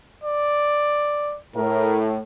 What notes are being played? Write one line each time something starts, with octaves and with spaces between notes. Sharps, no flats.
D5
A2 A#4